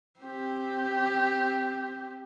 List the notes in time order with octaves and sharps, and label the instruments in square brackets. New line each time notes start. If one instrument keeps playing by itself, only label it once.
[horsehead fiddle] C4 G4